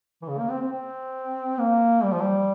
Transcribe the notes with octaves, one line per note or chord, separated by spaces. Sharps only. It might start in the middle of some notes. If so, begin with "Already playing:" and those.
E3
C#3
A#3
C4
C4
C4
A#3
G3
F3
G3